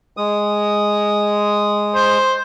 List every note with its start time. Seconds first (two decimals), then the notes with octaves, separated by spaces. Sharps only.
0.17 G#3 D#6
1.95 C5